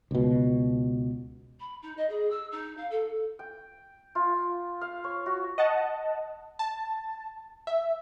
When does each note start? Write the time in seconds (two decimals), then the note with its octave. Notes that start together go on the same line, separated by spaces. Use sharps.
0.11 C#2 B2
1.59 B5
1.82 D#4
1.97 D#5
2.09 G#4
2.30 E6
2.51 D#4
2.77 F5
2.90 A4
3.39 G5
4.15 F4
4.81 F5
5.04 C#5
5.26 F#4
5.58 D#5 F#5 A5
6.59 A5
7.67 E5